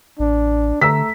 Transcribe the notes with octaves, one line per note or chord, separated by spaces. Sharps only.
A1 D4
D3 A3 A#5 E6 B6